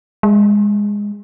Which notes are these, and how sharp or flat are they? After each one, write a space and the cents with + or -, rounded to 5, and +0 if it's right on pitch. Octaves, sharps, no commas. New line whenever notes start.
G#3 -15